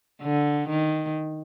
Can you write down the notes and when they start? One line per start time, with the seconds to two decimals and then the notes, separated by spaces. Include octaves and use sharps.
0.22 D3
0.68 D#3